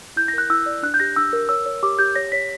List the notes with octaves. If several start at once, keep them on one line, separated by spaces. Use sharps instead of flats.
E4 G6
A#6
A#4 F#6
E4 E6
D5
D4 F#6
G6
G4 A#6
D4 E6
A#4
C#5 E6
C#5
G4 D6
G4 G6
C#5 A#6
C#5 B6